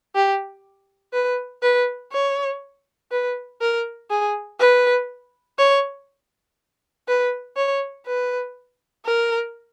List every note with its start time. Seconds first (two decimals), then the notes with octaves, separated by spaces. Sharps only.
0.15 G4
1.13 B4
1.63 B4
2.12 C#5
3.11 B4
3.61 A#4
4.10 G#4
4.60 B4
5.58 C#5
7.08 B4
7.56 C#5
8.06 B4
9.05 A#4